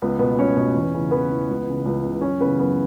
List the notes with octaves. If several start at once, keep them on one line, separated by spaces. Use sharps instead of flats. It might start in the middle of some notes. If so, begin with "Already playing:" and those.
C#2 B3
B2 B3
C#2 C#4 C#5
B2
E2
C#3 E3
E2 B3 B4
C#3 E3
C#2
C#3 E3
C#2
C#3 E3
F#2 C#4 C#5
C#3 E3 B3 B4
F#2 B3 B4